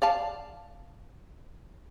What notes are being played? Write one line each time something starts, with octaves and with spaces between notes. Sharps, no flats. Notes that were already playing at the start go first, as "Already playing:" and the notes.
D5 F5 A5